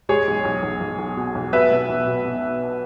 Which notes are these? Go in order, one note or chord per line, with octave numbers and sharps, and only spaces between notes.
G#3 G#4 C#5
B1
B1
B1
B1
B1
B2
B1
B2 B4 E5
B2
B1
B2
B2